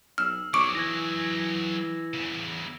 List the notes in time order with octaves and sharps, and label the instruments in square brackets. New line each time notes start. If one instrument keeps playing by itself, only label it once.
[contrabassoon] B1 [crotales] E6 E7 [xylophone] F6
[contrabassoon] B1 [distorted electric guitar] F#3 G#4 [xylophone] C#6 D6 D7 [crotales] C#7
[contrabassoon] E3 [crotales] G#6 A#6
[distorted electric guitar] E2 C#3